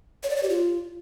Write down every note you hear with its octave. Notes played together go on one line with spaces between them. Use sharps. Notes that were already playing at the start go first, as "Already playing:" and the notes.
C#5
D5
C#5
G4
F4